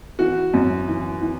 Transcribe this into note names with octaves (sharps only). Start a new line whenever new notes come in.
E3 F#4
F#2
E3
E3